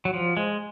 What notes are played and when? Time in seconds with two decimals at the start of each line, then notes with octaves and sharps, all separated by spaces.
0.05 F#3
0.13 F3
0.37 G#3